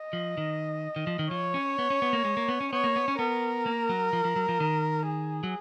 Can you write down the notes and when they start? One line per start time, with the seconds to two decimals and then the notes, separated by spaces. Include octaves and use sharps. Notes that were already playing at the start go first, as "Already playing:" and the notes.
Already playing: D#5
0.13 F3
0.37 D#3
0.96 D#3
1.07 F3
1.19 D#3
1.31 F3 C#5
1.54 C#4
1.79 B3
1.90 C#4
2.02 B3
2.13 A#3
2.25 G#3
2.37 A#3
2.48 B3
2.61 C#4
2.72 B3 C#5
2.84 A#3
2.96 B3
3.08 C#4
3.19 B3 A#4
3.66 A#3
3.89 F#3
4.13 F3
4.25 F3
4.36 F#3
4.49 F3
4.60 D#3
5.07 G#4
5.43 F#3